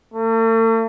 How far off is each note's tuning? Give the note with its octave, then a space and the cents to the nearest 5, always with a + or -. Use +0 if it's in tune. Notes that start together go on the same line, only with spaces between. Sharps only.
A3 +45